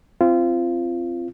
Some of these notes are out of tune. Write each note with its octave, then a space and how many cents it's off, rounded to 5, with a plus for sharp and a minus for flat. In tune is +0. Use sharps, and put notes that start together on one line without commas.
C4 +0 F4 -25